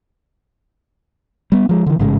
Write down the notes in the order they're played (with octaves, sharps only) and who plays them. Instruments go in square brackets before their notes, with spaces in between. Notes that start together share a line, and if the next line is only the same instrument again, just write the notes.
[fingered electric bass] G3 B3
F3 G#3
D3 E3
A1 G#2 C#3 G#3